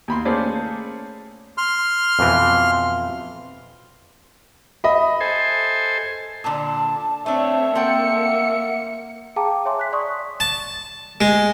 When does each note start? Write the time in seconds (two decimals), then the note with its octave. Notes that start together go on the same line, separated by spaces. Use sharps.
0.08 D#2 B5 C6
0.25 A3 A#3 C#4 G#4 C5 D5
1.58 C6 F6
2.19 F2 B2 E3
4.84 D#5 E5 B5
5.21 A4 C5 G#5
6.44 A#2 D3 A5
7.26 A3 C4 D4 C#5 E5 A5
7.75 A#3 C4 A4 F#5 G5 C#7
9.36 G#4 F5 G5 A5 A#5 D6
9.51 D6
9.65 C#5 E5 G#5 C6 D6
9.79 F#6 B6
9.92 D5 C6 C#6 D#6
10.40 A5
11.21 G#3